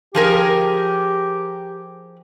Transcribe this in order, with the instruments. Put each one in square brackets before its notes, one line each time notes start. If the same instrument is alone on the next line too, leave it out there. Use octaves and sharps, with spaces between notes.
[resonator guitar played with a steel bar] F3 G#4 A#4 [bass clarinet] G4